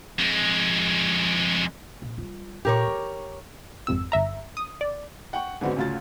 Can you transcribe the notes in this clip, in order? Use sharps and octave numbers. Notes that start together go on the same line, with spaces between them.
F2 G#3
A#1
G3 F4
A#2 G4 A#4 C#5
D#3
G#1 F2 C3 E6
G1 E5 A#5
D#6
D5
F#5 G5 C#6
G#2 D3 B3 C4 F#4
D2 C#3 F4 F#4 A6